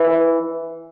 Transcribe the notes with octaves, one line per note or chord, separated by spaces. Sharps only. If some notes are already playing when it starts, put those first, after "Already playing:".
Already playing: E3